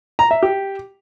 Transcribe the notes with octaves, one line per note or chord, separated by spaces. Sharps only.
A#5
E5
G4